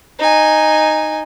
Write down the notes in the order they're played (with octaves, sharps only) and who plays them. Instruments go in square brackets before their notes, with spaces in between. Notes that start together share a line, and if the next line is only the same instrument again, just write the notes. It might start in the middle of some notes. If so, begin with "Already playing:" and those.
[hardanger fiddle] D#4 G#5